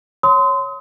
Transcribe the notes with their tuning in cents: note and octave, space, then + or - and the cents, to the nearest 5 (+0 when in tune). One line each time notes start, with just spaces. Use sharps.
C#5 +0 C6 -25 D#6 +35